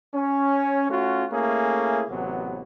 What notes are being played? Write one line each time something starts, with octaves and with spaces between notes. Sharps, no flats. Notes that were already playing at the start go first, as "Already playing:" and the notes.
C#4
A3 C#4 F4 F#4
A3 A#3 C#4 E4 G#4
A1 C3 F#3 B3